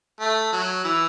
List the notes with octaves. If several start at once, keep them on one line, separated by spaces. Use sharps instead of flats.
A3
F#3
E3